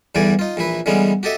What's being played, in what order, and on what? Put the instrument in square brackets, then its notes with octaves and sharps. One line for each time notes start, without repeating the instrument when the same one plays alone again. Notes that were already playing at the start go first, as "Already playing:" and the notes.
[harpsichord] E2 G2 D3 E3 D5 G#5
D#4 F4
A#1 E3 E4 B4
D3 E3 G3 G#3 B3 C#4
F#4 G4 A4 D#5 E5